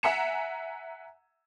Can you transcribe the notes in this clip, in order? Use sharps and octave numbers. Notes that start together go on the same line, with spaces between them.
E5 F#5 G#5 A#5 C#7 E7